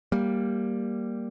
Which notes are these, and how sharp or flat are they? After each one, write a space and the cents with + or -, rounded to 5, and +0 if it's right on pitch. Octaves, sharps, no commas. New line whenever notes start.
G3 +0 A#3 +0